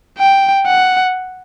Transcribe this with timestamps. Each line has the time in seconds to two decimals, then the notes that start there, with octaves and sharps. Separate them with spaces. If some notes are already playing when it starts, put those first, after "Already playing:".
0.19 G5
0.67 F#5